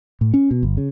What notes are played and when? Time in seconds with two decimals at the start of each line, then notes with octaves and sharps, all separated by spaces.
0.21 A2
0.34 C#4
0.51 B2
0.63 G1
0.77 C#3